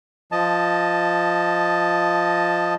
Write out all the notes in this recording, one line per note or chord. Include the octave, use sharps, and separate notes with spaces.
F3 D#5 A5